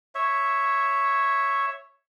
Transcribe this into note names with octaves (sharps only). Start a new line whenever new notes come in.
C#5 E5